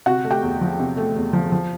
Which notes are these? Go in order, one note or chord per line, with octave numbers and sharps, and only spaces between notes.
C3 F#4 F#5
A3
G4 G5
E2
F3
C3
A3
E2
F3
F3